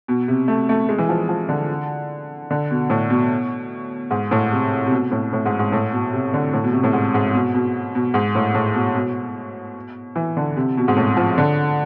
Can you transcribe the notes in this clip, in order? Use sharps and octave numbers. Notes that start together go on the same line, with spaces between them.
B2
C3
A3
A3
G#3
E3
F3
G#3
F3
D3
D3
B2
A2
B2
G#2
A2
C3
C3
B2
A2
A2
G#2
G#2
A2
B2
C3
D3
A2
B2
C3
A2
G#2
G#2
B2
B2
B2
G#2
A2
A2
B2
B2
E3
D3
C3
B2
G#2
A2
F3
D3